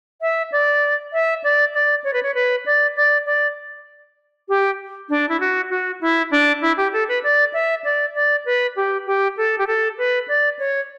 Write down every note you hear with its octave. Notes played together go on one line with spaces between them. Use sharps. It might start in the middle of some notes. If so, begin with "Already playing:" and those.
E5
D5
E5
D5
D5
C#5
B4
C#5
B4
D5
D5
D5
G4
D4
E4
F#4
F#4
E4
D4
E4
G4
A4
B4
D5
E5
D5
D5
B4
G4
G4
A4
G4
A4
B4
D5
C#5